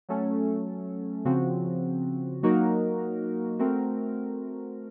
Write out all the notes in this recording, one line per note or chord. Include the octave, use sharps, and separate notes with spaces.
F#3 A3 C#4 A4
C#3 F3 C4 F#4
F#3 A#3 D#4 F#4 A#4
A3 C4 F#4 A#4